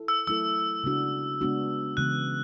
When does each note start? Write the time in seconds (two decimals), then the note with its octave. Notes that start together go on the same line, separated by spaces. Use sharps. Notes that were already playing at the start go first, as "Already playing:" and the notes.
Already playing: E4 A4
0.08 E6
0.27 F#3 A3 E4 A4 E6
0.84 C#3 G#3 B3 D4 F#4
1.41 C#3 G#3 B3 D4 F#4
1.97 C#3 E3 G#3 B3 F#6